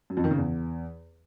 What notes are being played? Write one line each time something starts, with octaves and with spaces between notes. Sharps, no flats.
F#2
F2
D#3
C#3
E2